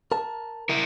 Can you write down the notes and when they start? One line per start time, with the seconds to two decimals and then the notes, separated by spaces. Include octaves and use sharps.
0.12 A#4 A5
0.69 E4 A#4